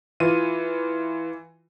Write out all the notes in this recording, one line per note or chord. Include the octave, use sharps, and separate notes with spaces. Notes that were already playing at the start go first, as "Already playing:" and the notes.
E3 F4 D#7